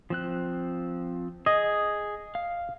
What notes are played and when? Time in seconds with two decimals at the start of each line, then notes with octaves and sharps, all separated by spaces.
0.10 F3 C4 F#6
1.46 G#4 D#5
2.35 F5